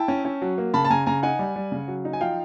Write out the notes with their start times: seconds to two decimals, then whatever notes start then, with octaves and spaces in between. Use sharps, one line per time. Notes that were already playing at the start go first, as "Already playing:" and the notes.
Already playing: E4 G5 A5
0.08 C#4
0.25 C#4
0.42 F#3
0.58 A#3
0.74 C#3 A5 B5
0.85 A5
0.90 C#3 G#5 A#5
1.06 C#3 G#5 A#5
1.23 D#4 F#5 G#5
1.39 G3
1.56 G3
1.72 C#3
1.88 F#3
2.05 D#4
2.13 G#5
2.21 F3 F5 G5